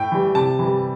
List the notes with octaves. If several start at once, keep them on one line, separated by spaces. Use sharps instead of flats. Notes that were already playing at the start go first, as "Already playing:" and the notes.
Already playing: A2 G5
E3 G3
C3 A5
E3 G3